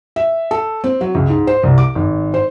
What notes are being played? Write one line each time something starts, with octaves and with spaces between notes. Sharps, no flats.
E5
A4
C4
F#3
C#2
G#2
C5
C2
D6
G#1
C5